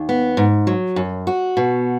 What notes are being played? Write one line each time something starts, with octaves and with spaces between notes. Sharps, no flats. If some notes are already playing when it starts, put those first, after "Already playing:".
Already playing: D#2
B3
G#2
F#3
F#2
F#4
B2